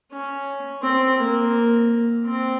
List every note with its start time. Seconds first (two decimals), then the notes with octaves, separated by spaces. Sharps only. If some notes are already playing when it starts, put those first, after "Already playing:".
0.12 C#4
0.82 C4
1.18 A#3
2.26 C4